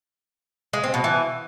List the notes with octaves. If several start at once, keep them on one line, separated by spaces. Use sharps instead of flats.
G#3
C4
B2
E3